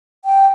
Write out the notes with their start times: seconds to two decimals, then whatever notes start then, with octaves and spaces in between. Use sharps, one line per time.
0.25 G5